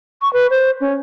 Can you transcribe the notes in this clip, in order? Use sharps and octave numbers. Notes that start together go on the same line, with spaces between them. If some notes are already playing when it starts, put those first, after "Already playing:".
C#6
B4
C5
C#4